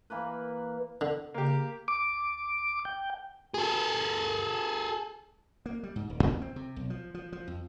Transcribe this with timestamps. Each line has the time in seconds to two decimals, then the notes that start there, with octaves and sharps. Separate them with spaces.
0.10 E3 A#3 B4
1.01 D3
1.34 C#3 A#3 G4
1.88 D6
2.85 G5
3.54 G#4 A4
5.66 A#3
5.83 G3
5.96 G#2
6.10 D#1
6.23 E2
6.42 C4
6.56 C3
6.76 B1
6.90 F3
7.14 F3
7.32 F3
7.48 F2